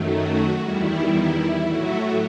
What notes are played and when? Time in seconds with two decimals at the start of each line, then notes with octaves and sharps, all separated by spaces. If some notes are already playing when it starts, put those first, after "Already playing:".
Already playing: F#2 D#3 F#3 A3
0.09 F#4
0.60 E2 D#3 G3 E4
1.60 A2 F#3 A3 F#4